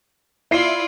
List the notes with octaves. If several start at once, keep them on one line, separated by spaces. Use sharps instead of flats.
E4 F4 D5 C7